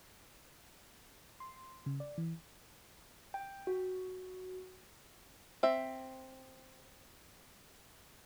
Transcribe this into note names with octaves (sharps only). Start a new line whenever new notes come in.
C6
C#3
D5
E3
G5
F#4
C4 E5